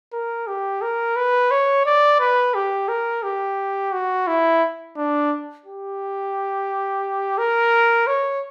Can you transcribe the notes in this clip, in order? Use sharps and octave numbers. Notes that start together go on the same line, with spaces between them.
A#4
G4
A#4
B4
C#5
D5
B4
G4
A#4
G4
F#4
E4
D4
G4
A#4
C#5